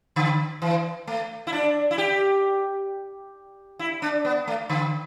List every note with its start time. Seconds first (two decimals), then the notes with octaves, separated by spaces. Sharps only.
0.16 D3
0.62 E3
1.07 A3
1.47 E4
1.53 D4
1.91 E4
1.98 G4
3.79 E4
4.02 D4
4.25 B3
4.47 A3
4.69 D3